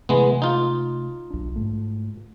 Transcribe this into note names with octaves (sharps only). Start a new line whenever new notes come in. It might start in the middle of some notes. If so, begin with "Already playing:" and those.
C3 E3 G#3 A3 B3
D#4 F4
B1 D4
G#2 A3